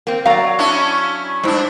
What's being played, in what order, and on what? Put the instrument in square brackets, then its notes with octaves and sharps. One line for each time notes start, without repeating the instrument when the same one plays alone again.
[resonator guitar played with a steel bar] A#3 C4 [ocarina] A#4
[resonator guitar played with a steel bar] F#3 A#5 [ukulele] D5 F5 [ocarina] C#6
[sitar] C#4 D4 E4
[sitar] G2 D4 [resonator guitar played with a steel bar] G#3 E4 [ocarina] C5